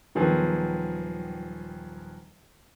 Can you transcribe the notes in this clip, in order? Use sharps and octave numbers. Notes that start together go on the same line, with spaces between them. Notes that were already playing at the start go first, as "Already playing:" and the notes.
D#1 D#3 F3 F#3 B3 G#4